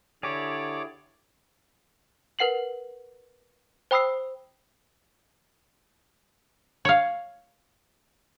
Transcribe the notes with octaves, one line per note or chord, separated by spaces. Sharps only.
D3 E4 G4 G#4 C#5 D5 D6
A#4 B4 F#5 C7 F#7
C5 G5 B5 D#6 E6 C7
C#5 F5